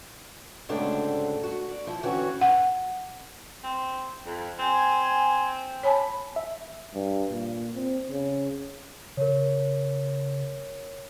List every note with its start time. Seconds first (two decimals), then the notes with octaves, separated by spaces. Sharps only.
0.69 D2 G#2 C#3 C4 D4 A4
1.43 F#4
1.68 D5
1.87 F3 E4
2.03 D3 E3 C4 C#4 F#4
2.41 F#5
3.64 C4
4.26 F2
4.59 C4 G#5
5.83 C#5 G#5 A5 B5
6.36 E5
6.94 G2
7.31 A#2
7.75 C4
8.09 C#3
9.17 C#3 A#4 C#5